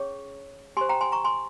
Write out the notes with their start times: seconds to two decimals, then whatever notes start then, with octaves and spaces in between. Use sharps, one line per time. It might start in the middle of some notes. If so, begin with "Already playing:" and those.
Already playing: C#4 G#4 C#5 C#6
0.77 G4 G#5 C6
0.81 C5
0.89 G5 A#5
1.01 G#5 C6
1.12 A#5 C#6
1.25 G#5 C6